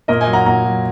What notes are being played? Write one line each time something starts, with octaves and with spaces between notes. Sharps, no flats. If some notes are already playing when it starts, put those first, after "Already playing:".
A#2 A#4 D#5
D#5 G#5
F#3
F#5 A#5
A#2 F#5 A#5
F#3